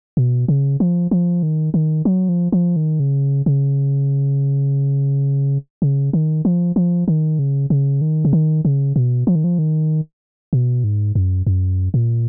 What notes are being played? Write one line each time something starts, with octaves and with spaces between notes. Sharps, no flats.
B2
C#3
F3
F3
D#3
D#3
F#3
F3
F3
D#3
C#3
C#3
C#3
D#3
F3
F3
D#3
C#3
C#3
D#3
C#3
D#3
C#3
B2
F3
D#3
F3
D#3
B2
G#2
F#2
F#2
A#2